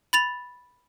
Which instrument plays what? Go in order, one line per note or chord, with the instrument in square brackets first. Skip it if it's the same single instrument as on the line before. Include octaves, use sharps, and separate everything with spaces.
[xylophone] B5 A6 F7